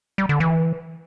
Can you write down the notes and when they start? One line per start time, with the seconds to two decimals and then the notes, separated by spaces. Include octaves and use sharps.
0.18 G3
0.29 D3
0.40 E3